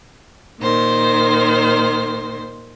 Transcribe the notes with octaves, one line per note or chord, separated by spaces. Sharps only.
A#2 D#3 C5